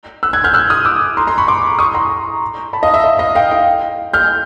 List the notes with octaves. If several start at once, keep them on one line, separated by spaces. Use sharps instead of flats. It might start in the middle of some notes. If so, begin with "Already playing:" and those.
E6 F#6
F#6 G#6
F6 G6
E6 F#6
D#6 F6
D6 E6
A#5 C6
A#5 C6
B5 C#6
C6 D6
C#6 D#6
A#5 C6
A5 B5
D#5 F5
E5
D#5
D#5 F5
F5 G5
F5 G5
F6 G6